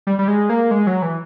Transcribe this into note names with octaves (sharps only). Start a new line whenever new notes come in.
G3
G3
G#3
A#3
G#3
F#3
E3